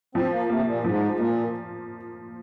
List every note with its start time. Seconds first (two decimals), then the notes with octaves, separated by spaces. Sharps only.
0.15 F3 C4
0.32 A#3
0.49 C3 A#3
0.67 A#2
0.84 G#2 F3
1.11 G#2
1.19 A#2 A#3